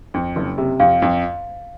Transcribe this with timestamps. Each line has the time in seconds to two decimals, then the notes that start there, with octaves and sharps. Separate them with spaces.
0.14 F2
0.36 F#1
0.58 C3
0.80 F2 F5
1.02 F2